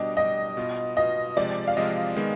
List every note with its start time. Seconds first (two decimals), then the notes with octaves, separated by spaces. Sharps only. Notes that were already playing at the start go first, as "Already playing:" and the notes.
Already playing: B2 G3 D4 G4 D#5
0.16 B2 G3 D4 G4 D#5
0.57 B2 B3 F4
0.97 B2 B3 F4 D#5
1.37 C3 F3 G#3 D5
1.67 F5
1.77 C3 F3 G#3 D#5
2.16 D#3 G#3 B3